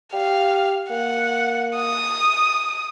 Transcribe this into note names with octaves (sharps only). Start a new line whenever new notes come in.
G4 F5
A#3 F#5
D#6